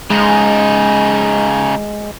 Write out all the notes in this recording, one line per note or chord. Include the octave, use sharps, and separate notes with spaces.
C#3 G#3 D#4